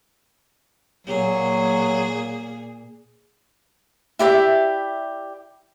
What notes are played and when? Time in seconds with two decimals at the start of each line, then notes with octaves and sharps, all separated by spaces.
1.07 A#2 F#3 A#3 G#4
4.19 E4 G4 D5 E5